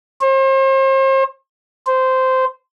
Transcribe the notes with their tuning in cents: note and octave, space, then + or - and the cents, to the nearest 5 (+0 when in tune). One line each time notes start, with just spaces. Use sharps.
C5 +40
C5 -10